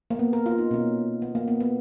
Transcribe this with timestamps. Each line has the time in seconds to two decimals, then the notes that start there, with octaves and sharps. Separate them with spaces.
0.10 A#3
0.19 B3
0.33 A#4
0.46 F4
0.58 D#4
0.71 B2 A#3 C#4
1.22 B3
1.35 A#3
1.48 B3
1.60 B3